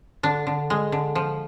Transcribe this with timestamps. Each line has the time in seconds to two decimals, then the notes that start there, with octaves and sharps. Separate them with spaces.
0.23 D3 D4
0.47 D3
0.70 G#3
0.92 D3
1.15 F3